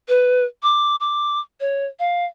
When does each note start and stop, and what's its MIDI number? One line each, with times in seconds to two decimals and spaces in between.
0.08 0.44 71
0.63 0.96 86
1.00 1.40 86
1.60 1.85 73
1.99 2.25 77